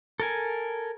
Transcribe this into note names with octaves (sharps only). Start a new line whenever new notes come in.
A4 A#4 G#5